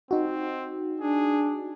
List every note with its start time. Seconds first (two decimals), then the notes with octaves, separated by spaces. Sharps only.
0.11 C4 D#4 F#4
1.00 D4 G#4